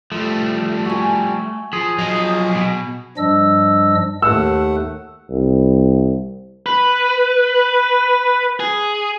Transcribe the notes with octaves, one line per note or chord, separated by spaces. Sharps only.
F3 G3 A3
F#4 G#5
F3 G#4
F3 F#3 D#5
B2
G2 F3 G3 D4 D#5 E6
D#2 A3 F#5 E6
C2
B4
G#4